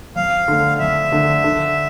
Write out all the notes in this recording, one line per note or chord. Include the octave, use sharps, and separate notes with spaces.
F2 F5
D3 A3
F2 E5
D3 A3
D3